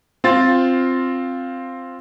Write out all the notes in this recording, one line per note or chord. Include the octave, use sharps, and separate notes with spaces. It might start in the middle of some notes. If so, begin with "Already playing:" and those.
C4 F4 A6